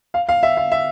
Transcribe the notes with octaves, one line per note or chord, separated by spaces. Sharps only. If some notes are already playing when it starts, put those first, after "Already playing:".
F5
F5
E5
F5
E5